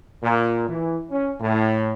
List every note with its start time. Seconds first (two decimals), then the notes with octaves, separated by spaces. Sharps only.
0.23 A#2
0.68 E3
1.11 C#4
1.41 A2